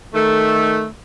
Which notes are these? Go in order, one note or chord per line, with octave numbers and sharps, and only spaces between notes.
D#3 A3